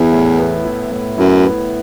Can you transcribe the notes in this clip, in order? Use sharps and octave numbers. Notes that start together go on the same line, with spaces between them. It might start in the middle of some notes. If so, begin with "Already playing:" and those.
Already playing: E2 B3 E4
A2
B3
E4
A2
F#2 E4
B3